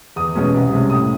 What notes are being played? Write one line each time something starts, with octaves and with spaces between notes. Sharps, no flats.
E2 D#6
B2 G#3 C#4
C2
C3 E3 G#3 C#4
A2 D#6